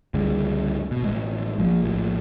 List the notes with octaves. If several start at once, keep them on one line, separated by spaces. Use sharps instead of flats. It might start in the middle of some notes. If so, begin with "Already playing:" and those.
C#2 G2 D3 G#3
B2
A1 G#3
A#1 F3
A#1 A2